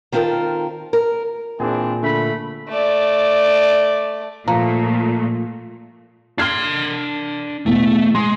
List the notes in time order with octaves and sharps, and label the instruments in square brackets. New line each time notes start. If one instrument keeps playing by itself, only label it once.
[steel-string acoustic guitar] D#3 C4 F4 A4 A#4
A#4
[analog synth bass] A#2 [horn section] E3 C4 D4 [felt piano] G#4
[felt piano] D3 [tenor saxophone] A3 [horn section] B5
[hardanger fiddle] A3 D5
[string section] A#2 A3 [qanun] F3 [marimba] A#5
[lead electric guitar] D4 C6 [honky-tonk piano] F6 G#6 C7
[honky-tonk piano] E2 B2 [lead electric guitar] A3
[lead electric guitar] G#3 [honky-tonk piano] C6